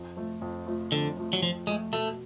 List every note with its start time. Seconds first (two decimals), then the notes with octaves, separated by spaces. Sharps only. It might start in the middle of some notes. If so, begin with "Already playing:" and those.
Already playing: F2
0.17 F3 A3
0.42 F2
0.66 F3 A3
0.92 F2 D3
1.17 F3 A3
1.33 F#3
1.42 F2 F3
1.67 F3 G#3 A3
1.93 B2 A3